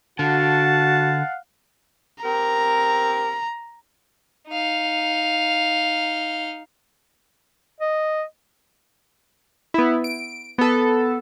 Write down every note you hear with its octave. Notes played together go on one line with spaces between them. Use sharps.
D3 F#4 F5 F#5 A5
C4 G4 A#4 A#5
D#4 F5
D#5
B3 E4
D7
B3 A4